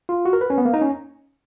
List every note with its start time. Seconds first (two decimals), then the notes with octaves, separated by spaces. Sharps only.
0.09 F4
0.25 F#4
0.33 A#4
0.41 B4
0.50 C#4
0.58 B3
0.65 A#3
0.74 D#4
0.82 C#4